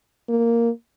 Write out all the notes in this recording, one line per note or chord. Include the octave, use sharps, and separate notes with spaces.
A#3